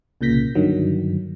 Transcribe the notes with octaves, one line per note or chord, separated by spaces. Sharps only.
C2 A#2 C#3 G6 A#6 B6
G2 D3 D#3 F#3